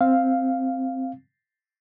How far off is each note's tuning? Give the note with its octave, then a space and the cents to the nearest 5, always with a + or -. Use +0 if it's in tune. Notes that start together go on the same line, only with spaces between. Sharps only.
C4 +0 F5 +0